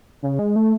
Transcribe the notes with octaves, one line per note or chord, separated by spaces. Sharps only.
C#3
G#3
A3